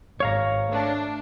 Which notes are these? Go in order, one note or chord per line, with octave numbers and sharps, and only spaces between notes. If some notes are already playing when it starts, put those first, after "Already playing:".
G#1 C#5 F5 A#5
A3 D4